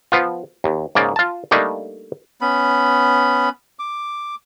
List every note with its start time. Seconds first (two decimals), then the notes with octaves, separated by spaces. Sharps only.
0.12 F3 B3 F4
0.64 D#2
0.95 G#2 C#3 A#3 D5
1.16 F4 A5
1.51 G3 A3 A#3 D4 D#4
2.41 B3 C#4 B5
3.79 D6